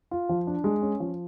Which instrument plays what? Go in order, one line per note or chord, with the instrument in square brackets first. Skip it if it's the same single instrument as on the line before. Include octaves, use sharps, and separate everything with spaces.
[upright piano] F4
F3
D4
G#3
C#4
F3